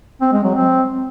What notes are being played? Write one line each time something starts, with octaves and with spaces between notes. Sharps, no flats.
C4
G#3
F#3
C4